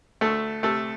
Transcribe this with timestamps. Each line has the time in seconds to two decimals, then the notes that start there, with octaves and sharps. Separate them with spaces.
0.21 D2 A3 A4
0.63 C3 A3 A4